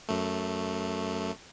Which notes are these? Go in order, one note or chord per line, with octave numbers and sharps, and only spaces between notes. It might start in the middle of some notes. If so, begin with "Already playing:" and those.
F#2 A3